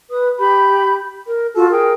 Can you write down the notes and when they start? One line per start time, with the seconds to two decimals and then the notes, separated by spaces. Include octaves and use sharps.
0.11 B4 D#6
0.39 G4 B5 G6
1.27 A#4
1.55 F4 F#4 A4 A5
1.71 G#4 A#4 G5